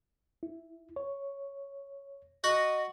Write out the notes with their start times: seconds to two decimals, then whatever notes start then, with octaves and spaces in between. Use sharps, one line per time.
0.43 E4
0.96 C#5
2.44 F#4 D#5 F#5